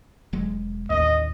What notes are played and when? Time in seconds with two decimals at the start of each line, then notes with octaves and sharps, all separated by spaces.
0.33 E1 F#3 G#3
0.90 A1 D#2 D#5